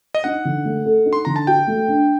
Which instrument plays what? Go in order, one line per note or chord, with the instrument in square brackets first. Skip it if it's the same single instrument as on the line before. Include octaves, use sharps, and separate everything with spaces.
[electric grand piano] D#5
[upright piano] D#4 [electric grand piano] F#5
[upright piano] D3
A3
A4
D#4
[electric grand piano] C6
[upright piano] D3 [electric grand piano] A#5
[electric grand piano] A5
[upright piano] F#4 [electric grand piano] G5
[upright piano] A3
D4